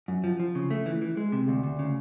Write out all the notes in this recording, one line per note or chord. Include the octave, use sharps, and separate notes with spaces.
F#2
F3
F3
C#3
A3
E3
E3
G#3
C3
D2
D2
C#3